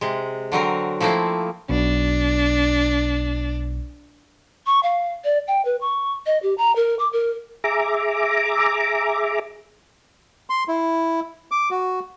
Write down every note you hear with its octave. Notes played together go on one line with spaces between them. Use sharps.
C3 G#3
D3 F#3 C4 A#4
F3 A3 A#3 C4 E4
B1 B2 D4
C#6
F5
D5
G5
B4
C#6
D#5
G4
A#5
A#4
D6
A#4
G#4 E5 A#5 D6
C6
E4
D6
F#4